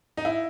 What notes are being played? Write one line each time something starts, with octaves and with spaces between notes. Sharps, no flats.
D#4
E4